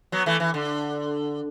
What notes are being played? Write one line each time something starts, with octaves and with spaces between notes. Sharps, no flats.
F#3 B3
E3 A3
E3
D3